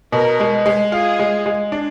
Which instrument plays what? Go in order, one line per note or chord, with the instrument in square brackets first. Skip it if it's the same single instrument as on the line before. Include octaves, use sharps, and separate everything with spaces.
[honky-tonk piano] B2 [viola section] A#4
[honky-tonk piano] G#3
G#3
[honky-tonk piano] F4 [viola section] G#4
[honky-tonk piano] G#3
G#3
D4